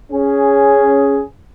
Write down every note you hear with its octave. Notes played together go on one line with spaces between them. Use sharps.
C#4 G#4